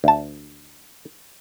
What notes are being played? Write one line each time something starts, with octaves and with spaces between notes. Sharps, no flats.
D2 A5